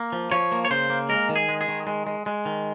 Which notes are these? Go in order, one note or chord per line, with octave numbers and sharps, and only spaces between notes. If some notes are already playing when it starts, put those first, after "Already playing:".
Already playing: A#3
F3
F3 C#5
A#3
C#5
C#3 C5
A#3
G#3 A#4
D#3
G#4
G#3
G#4
D#3
G#3
G#3
G#3
D#3